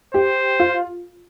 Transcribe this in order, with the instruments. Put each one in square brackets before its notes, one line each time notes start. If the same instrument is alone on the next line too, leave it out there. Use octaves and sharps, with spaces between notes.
[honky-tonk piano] G4 [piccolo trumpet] C5
[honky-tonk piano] F4